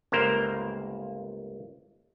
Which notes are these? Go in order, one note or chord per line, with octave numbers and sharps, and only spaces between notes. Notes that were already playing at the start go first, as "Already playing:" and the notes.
G1 C#2 A#3 A#4 C5